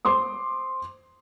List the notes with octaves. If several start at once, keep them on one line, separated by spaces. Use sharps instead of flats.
C5 C6 D6 D#6